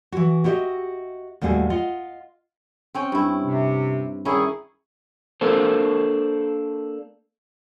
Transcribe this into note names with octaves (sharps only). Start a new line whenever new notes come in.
E3 F#4
E4 F#4 G4 C#5 D#5 E5
D#2 A2 G3 F#4 G#4
F4 D#5 F#5
C4 C#4 G5
G2 E4
C3
C2 D#3 C#4 E4 G#4
A#3 D4 A4 A#4 C5